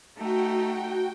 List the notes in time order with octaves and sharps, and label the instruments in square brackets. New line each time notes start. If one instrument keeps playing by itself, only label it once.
[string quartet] A3 D#4 A4 [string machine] F#4 G5